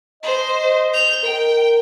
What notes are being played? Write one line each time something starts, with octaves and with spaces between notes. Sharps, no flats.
C5 D#5
G6 F7
A#4 G5